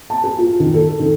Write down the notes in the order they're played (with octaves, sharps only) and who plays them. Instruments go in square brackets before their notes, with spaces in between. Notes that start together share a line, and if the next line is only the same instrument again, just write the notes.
[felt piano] A5
G#4
F4
D#3
A4
D#3